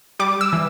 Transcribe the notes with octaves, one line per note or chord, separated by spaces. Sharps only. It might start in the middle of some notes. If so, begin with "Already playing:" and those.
G3 D6
E6
E3